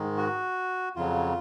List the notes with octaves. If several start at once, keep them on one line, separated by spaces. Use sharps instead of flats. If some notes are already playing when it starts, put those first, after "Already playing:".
Already playing: G#2 D#3 G#3
F#4
F2 C#3 F#3 F4